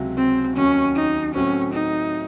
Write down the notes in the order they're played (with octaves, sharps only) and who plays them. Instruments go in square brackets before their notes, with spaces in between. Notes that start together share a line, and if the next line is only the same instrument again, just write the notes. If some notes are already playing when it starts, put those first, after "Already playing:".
Already playing: [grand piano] C#2 C3 F#3
[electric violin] C4
[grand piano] D#2 D#3 F#3 [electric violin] C#4
[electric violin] D#4
[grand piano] A2 F#3 C4 [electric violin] C#4
[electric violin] D#4